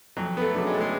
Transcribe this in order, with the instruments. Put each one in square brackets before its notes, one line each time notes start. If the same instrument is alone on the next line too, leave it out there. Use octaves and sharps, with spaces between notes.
[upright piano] F2 [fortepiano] F#3
[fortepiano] B3
A3
[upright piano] C#3 F#3 B3 D4
[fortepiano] G#3
A3
G#3